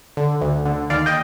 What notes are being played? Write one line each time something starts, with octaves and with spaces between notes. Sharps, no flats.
D3
D2
D3
D#2 D5 F5
D#5 G5